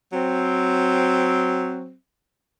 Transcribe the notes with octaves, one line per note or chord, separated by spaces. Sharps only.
F#3 C4